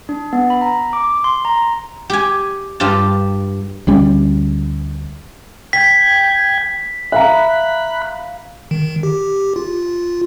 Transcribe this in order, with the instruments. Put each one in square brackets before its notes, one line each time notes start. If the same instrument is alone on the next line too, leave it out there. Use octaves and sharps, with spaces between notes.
[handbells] D4
B3
B5
A#5
D6
C6
A#5
[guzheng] G4 G#5
G2 F4 G4 A5
[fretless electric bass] D2 G3 C#4
[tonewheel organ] G5 G#6 [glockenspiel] B6
[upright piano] E5 F5 A#5 [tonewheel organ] B5 F#6
[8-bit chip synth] D#3
G4
F4